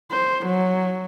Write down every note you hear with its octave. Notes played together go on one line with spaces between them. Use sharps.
C5
F#3